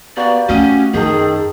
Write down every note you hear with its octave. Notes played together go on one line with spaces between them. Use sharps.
A#3 B3 F#4 G4 D5
A3 C#4 F#4 D#5
F#2 D#3 G#4 A4 G5